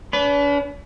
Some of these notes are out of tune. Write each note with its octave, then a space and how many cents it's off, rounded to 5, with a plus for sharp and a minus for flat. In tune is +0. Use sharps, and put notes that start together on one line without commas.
D4 -45 B4 +5